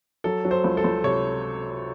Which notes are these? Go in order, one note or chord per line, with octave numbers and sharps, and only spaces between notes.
F#3 A4
F#3
C5
C#2
A4
C#2
C3 C#5